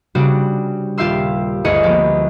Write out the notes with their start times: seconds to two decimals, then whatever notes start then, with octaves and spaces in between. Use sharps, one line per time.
0.15 C#3 G3 C4 D4 F#4
0.98 D#1 F4 G4 E5 C6 E6
1.65 G1 D2 G#4 D#5 C#7
1.83 F3 G#3 A#3 B3 G4